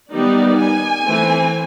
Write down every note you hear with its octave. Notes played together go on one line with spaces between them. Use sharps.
D#3 G3 B3 D#4 D5
G#5
E3 A3 C4